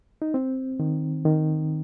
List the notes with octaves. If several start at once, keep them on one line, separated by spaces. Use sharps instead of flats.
D#4
C4
D#3
D#3